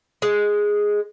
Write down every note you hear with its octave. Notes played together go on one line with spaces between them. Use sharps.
G#3